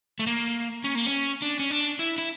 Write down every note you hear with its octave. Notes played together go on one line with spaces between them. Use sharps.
A3
A#3
C#4
A#3
C#4
D4
C#4
D4
E4
E4